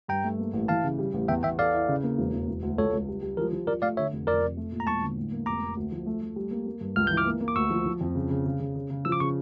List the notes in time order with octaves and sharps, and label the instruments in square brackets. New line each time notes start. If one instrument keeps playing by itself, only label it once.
[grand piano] G2 [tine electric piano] G5 A#5
[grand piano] A3
A#3
A1
[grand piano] E3 [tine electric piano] F5 A5
[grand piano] C#3
G3
A1
[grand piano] E2 [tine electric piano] E5 G5
[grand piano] E2 [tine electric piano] E5 G5
[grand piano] A4 [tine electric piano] D5 F5
[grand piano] E4
C#3
A#3
E1
E1
E1
D2
[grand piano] C#2 [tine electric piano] A4 C#5
[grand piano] C#2
G3
G3
[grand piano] F3 [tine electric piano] A#4
[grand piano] F3
[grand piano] F3 [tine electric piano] A#4 D5
[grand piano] A3 [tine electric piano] D5 F5
[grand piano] D3 [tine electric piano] C#5 E5
[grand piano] F1
[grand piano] F2 [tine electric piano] A#4 D5
[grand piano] F1
A3
A#2
[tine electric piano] A#5
[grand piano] E1 [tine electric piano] A5 C#6
[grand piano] D3
A2
A#3
[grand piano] F1 [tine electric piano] A#5 D6
[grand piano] A#3
D2
F3
A3
A3
G3
A#3
A#3
G2
[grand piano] C#2 [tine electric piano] F6
[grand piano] E3 [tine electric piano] G6
[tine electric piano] D6 F6
[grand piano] A#3
A#3
[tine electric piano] D6
[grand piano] D2 [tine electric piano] C#6 E6
[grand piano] F3
F3
F2
C#3
C#3
C#3
C#3
C#3
C#3
[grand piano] F3 [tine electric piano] E6
[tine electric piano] D6
[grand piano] C#3 [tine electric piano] C#6